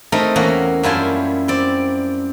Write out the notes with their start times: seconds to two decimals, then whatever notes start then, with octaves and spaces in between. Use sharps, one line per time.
0.12 A3 C4 D#4 A#4
0.36 E2 A#3 C#4 F#4
0.83 F#2 G3 E4 F4 G#5 A5
1.48 C4 D5